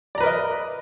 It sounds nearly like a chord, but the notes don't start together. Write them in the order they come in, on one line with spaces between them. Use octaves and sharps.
D5 A#5 B4 A#4 D#5